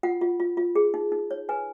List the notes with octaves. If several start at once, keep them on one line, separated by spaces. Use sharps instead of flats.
F4 F#5
F4
F4
F4
G#4
D#4
D#4
C#5
B4 G#5